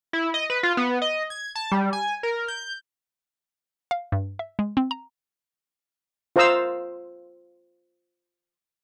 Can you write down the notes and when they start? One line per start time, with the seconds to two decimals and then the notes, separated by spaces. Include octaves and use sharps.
0.13 E4
0.34 D#5
0.50 B4
0.63 F4
0.77 B3
1.02 D#5
1.30 G#6
1.55 A5
1.72 G3
1.93 G#5
2.23 A#4
2.48 G6
3.91 F5
4.12 G2
4.39 E5
4.59 G#3
4.77 C4
4.91 A#5
6.36 F4 C5 F5 A#5 D#6 E6